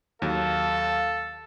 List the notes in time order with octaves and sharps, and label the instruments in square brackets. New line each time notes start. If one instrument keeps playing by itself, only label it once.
[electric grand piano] D#2 F#3 [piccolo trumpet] A4 [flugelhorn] F5